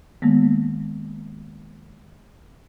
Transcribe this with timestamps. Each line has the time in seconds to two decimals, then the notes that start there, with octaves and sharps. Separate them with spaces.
0.22 D#3 G#3 A#3 B3